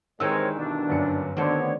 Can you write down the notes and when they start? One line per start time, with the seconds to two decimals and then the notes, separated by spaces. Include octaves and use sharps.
0.20 G2 D#3 E3 G#3 C4 A#4 C#5 E6
0.56 D2 G2 B2 D4
0.89 G1 F#2 C#7
1.37 D2 D3 D#3 B3 C4 C#5